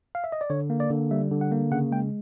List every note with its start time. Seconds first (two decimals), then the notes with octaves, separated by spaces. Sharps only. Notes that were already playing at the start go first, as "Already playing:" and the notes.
0.15 F5
0.24 E5
0.32 D#5
0.41 D5
0.50 D3 C#5
0.70 A#3
0.80 D5
0.90 D3
1.11 G3 E5
1.31 D3
1.41 F#5
1.52 A#3
1.71 C#3 F#5
1.92 G#3 G5